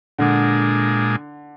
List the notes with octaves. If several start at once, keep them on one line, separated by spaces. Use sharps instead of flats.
A#2 D3 G#3 D4